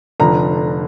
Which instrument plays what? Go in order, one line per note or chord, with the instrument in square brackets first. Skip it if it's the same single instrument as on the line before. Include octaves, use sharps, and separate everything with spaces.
[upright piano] F1 D3 F3 A#5